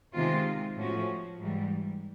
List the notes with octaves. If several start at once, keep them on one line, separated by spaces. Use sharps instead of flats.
C3 D#3 G#3 C4 F4
A2 F3 A3 C#4 F#4
G#2 E3 G3